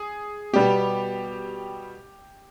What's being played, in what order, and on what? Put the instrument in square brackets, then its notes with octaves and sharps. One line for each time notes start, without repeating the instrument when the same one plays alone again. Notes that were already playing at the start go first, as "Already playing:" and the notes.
Already playing: [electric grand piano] G#4
[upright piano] B2 G3 B3 [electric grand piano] G4